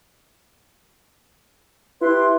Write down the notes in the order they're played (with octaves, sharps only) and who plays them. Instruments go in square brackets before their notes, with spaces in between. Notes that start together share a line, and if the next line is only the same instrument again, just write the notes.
[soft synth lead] E4 [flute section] G4 C6 F#6 [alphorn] B4